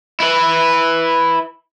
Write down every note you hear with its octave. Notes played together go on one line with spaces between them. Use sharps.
E4 B4